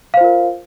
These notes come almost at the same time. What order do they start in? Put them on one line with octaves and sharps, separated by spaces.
F5 C5 F4 A#4